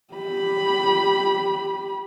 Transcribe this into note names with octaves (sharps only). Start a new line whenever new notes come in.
G4 B5